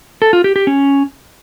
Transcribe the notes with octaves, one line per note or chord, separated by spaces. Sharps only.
A4
F4
G4
G4
C#4